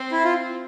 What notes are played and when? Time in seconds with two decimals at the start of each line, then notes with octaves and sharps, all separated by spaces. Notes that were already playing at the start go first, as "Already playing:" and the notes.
Already playing: C4
0.12 E4
0.24 F4